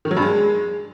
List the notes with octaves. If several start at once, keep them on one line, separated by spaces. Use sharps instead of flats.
D#3
F#3
G2
G#3